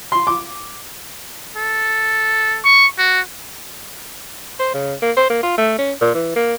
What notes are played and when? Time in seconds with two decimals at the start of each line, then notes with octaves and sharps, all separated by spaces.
0.12 C6
0.27 D6
1.56 A4
2.64 C#6
2.98 F#4
4.59 C5
4.74 C#3
5.02 A#3
5.17 C5
5.30 A#3
5.43 F4
5.58 A3
5.79 C#4
6.01 A#2
6.14 E3
6.36 A#3